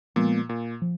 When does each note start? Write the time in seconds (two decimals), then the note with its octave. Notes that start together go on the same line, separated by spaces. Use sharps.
0.16 A#2 F3 G#3 B3
0.49 A#2
0.82 F3